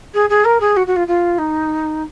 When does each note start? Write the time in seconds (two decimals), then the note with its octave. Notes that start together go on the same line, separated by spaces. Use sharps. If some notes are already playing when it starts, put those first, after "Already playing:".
0.13 G#4
0.29 G#4
0.44 A#4
0.60 G#4
0.76 F#4
0.86 F#4
0.96 F4
1.07 F4
1.38 D#4